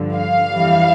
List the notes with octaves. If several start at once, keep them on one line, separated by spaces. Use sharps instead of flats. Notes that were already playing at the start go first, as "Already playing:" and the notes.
Already playing: G2 D3 F3
F5
F2 E3 G3